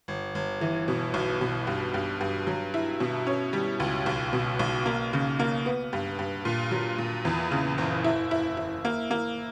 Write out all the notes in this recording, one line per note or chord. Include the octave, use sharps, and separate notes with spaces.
G1
G1
E3
B2
B1
B2
G2
G2
G2
F#3
E4
B2
C#4
G3
C#2
B1
B2
B1
A#3
C#3
A#3
B3
G2
G2
A#2
F#3
A#2
E2
C#3
F#1
E4
E4
E4
A#3
A#3